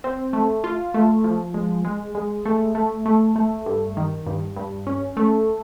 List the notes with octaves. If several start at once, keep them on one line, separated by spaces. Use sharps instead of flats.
C4
A3
F4
A3
F3
G#3
G#3
G#3
A3
A3
A3
A3
G2
D#3
G2
G2
C#4
A3